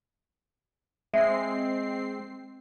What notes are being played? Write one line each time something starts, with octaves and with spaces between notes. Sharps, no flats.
G#3 C4 E5 C7